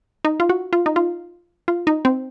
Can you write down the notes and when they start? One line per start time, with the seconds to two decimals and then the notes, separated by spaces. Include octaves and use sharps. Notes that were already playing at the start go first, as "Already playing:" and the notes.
0.25 D#4
0.40 F4
0.49 F#4
0.73 F4
0.86 D#4
0.96 F4
1.68 F4
1.87 D#4
2.05 C4